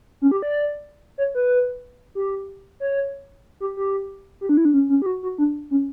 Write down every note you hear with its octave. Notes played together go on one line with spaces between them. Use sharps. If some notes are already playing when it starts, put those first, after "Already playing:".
C#4
G4
D5
C#5
B4
G4
C#5
G4
G4
G4
D4
E4
D4
C#4
C#4
G4
F#4
F#4
D4
C#4